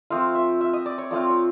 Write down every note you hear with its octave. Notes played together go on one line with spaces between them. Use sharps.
F3 A3 C4 F4 F5
E5
E5
D#5
D5
C#5
F3 A3 C4 F4 D5
C#5